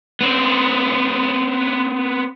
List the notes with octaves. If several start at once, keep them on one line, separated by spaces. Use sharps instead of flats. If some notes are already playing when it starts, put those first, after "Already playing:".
B3 C4